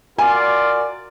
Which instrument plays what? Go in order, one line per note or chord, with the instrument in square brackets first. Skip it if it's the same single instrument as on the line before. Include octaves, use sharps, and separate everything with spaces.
[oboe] F4 [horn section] F#4 A#4 D5 [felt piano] G#5